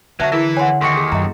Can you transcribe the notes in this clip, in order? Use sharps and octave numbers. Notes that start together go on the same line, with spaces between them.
D3 F#3 F#4 B4 E5 A5
E3 E4 G#4 A#4 B4
C#5 F#5 G#5 C6
D#2 A4 F#5 C6 C#6 C#7
G#4
F#2 D#5 A#5